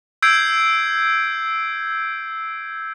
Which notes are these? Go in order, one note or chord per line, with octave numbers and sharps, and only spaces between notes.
E6 G6 G#6 C7 D7